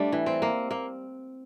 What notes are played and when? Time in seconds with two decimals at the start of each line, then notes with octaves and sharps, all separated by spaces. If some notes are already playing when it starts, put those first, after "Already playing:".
Already playing: G3 A3 D4
0.12 E3
0.26 C4
0.42 A#3
0.71 A#3